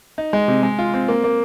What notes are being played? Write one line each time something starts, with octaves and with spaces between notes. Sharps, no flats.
D#4
G#3
C3
G#3
F4
C4
A#3
A#3